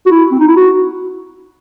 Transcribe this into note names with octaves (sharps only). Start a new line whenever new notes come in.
F#4
E4
C4
D#4
E4
F#4